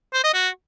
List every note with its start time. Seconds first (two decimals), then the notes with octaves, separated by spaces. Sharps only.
0.13 C5
0.23 D#5
0.34 F#4